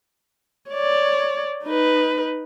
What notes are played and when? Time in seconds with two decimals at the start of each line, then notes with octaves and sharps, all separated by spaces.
0.70 C#5 D5
1.64 D#4 B4